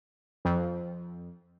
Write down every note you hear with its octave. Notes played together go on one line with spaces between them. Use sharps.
F2